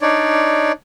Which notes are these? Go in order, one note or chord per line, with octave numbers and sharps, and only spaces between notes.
D4 D#4 C#5 D5